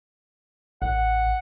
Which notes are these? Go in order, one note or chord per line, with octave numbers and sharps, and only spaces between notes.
A1 F#5